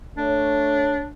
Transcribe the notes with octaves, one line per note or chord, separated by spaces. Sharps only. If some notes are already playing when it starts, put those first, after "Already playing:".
A3 D4 C#5